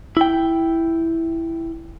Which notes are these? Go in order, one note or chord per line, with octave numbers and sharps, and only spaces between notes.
E4 G5